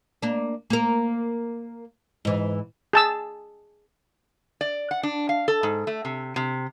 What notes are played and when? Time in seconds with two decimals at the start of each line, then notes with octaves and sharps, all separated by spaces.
0.22 A#3 D4
0.70 A#3 A#4
2.25 G#2 E3
2.93 G#4 A5 E6
4.61 D5
4.91 F#5
5.03 D4
5.29 F5
5.48 A4
5.63 G#2
5.87 A3
6.05 C3
6.36 C3